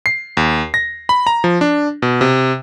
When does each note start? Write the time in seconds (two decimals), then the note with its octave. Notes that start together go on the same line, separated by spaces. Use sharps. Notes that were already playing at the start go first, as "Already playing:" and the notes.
0.06 C7
0.37 D#2
0.74 A#6
1.09 B5
1.27 A#5
1.44 F3
1.61 D4
2.02 B2
2.21 C3